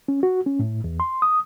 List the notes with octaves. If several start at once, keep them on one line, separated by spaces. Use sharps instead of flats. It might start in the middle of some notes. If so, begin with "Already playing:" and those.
C#4
F#4
C#4
A2
E2
C6
D#6